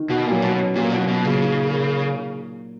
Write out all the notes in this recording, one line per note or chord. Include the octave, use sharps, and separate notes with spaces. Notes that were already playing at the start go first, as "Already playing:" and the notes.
Already playing: D#3
B2 F#4
A#2
F#3
B2
C#4
A#2 F#3
B2
F#3
B2
A#2 C#3
D#4
A#4